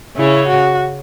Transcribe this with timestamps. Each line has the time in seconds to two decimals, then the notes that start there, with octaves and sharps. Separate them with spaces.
0.17 C#3 C#4 E4
0.48 F#4